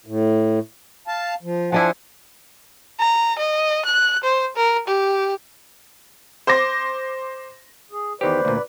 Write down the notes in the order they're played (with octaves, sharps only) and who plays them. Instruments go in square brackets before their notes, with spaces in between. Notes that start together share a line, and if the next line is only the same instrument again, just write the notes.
[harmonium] A2
F5 A5
F3
[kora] F3 D4 E4 [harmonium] C5 F#5 G#5
[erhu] A#5
D#5
F#6
C5
A#4
G4
[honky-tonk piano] C5 C6 D6 A#6
[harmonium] G#4
[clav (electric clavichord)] E2 D#3 G4 [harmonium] B4 D5 [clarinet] C5
[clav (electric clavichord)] D2 A#2